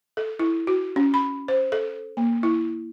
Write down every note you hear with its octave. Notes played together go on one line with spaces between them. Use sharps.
A4
E4
F#4
C#4
B5
C5
A4
A#3
E4